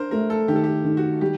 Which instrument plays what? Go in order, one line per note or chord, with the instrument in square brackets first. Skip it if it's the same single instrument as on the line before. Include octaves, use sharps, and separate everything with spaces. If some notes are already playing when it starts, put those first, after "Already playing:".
Already playing: [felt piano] D4 [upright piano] A#4 C5
[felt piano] A3 [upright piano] A#4
[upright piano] A4
[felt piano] D#3 [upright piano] G4
[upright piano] A4
G4
[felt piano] D#3
[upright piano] F#4
[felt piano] G3 [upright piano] G4